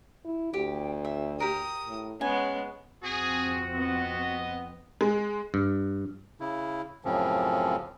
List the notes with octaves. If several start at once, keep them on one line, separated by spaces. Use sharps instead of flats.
E4
D2 G4
E5
G4 A#4 D#6
A2
G#3 B3 C#4 G#5
F2 C4 F#4 G#4
B3 D#5
G#3
G2
C#3 E4
F#2 A2 C#3 F3 C4 C#4